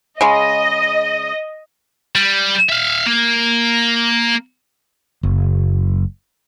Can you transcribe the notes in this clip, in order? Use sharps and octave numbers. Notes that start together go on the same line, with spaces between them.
C#3 G#3 D#5
G3
E5 F5
A#3
F#1